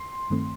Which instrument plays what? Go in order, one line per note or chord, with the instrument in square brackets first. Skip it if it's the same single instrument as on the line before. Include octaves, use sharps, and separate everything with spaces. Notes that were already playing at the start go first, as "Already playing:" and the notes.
Already playing: [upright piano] C6
[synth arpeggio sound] G2 D#3 A3 C4